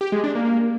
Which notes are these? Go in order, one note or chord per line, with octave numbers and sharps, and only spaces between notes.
G4
G#3
D4
A#3